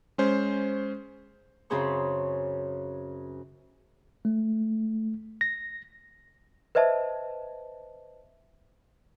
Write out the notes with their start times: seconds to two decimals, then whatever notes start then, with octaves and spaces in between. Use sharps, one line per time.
0.18 G#3 C#4 C5
1.70 F#2 C#3 C4 G#4 C5 C#6
4.25 A3
5.41 A#6
6.75 B4 C5 D#5 E5 A5